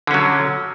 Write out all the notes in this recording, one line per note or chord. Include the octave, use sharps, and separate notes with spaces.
D3 F#3 C#4